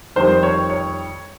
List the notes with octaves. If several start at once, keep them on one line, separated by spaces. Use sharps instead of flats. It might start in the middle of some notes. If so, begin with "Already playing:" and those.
F2 D#3 G3 C5
C#5
C#5